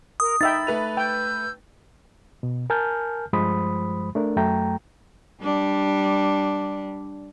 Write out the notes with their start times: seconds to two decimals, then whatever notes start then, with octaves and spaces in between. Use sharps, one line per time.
0.20 A#4 D#6
0.41 D#4 E5 G5 B5 A6
0.67 A3 B4 F7
0.97 G5 E6 G6
2.43 B2
2.70 A#4 G#5 A5 F6 G6
3.33 G2 F3 G#3 C5 B5 D#6
4.15 A3 D4 A#4
4.36 F#2 F#3 A3 G5 A#5
5.42 G3 D4